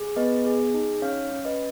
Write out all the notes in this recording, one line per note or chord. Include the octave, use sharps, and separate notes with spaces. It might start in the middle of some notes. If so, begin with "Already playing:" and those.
Already playing: G#4
B3 B4 D#5
G#4
D#4
C#4 C#5 F5
C#4
B4 D#5